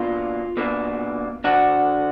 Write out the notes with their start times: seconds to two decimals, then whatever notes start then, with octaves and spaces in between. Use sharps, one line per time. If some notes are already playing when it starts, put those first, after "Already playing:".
Already playing: B2 A#3 D4 F4
0.57 B2 A#3 D4
1.44 D3 D4 F#4